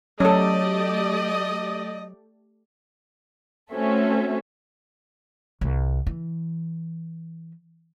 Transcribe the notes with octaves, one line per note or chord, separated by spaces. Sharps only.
F#3 A3 C#4 G4 A4 D5 D#5
A3 C4 C#4 F#4 A4 E5
C2
E3